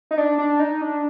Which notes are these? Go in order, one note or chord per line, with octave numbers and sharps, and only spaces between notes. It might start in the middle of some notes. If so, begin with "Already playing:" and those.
D#4
D4
D4
D#4
D4